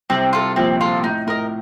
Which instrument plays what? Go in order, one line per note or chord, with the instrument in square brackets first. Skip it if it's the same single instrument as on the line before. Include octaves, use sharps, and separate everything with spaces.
[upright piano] C2 C3 [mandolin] C4
[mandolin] F4 A4
[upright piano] A#1 A#2 [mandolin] C4
[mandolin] F4 A4
[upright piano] A2 [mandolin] D#4
[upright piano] A2 [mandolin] A#4 D#5